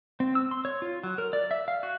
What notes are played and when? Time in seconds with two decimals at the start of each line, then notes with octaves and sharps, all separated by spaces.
0.20 C4
0.35 E6
0.51 C6
0.65 C#5
0.82 F4
1.04 F#3
1.18 A#4
1.33 D5
1.51 E5
1.68 F5
1.83 F#4